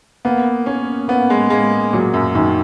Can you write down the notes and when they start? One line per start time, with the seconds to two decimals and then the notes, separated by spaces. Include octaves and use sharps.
0.25 A#3 B3
0.66 A#3 C#4
1.08 A#3 B3
1.30 G#3
1.50 G#3 A#3
1.93 A#2 F#3
2.14 F#2
2.35 F#2 D#3